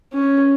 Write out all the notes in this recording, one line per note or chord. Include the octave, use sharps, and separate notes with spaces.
C#4